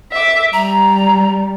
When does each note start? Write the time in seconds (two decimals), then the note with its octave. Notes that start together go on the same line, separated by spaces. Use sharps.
0.12 E5 D6
0.53 G3 A#5